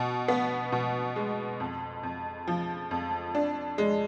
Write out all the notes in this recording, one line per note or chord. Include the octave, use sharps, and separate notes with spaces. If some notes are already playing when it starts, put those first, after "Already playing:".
Already playing: B2
B3
B2
G#3
F2
F2
F3
F2
D4
G#3